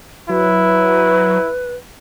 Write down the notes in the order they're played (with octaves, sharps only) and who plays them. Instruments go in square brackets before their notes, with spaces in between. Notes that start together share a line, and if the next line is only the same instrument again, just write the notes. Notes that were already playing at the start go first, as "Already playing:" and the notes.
[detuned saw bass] F#3 [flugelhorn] E4 [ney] B4